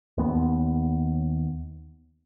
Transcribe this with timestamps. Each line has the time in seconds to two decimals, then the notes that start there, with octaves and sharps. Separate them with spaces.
0.18 D#2 B3